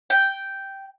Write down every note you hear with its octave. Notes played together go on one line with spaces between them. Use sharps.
G5